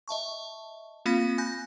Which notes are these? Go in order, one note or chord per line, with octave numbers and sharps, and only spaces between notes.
D#5 E5 A5 C#6
A#3 C4 F4 F5 B5 B6
G#5 B5 F#6 G6 A#6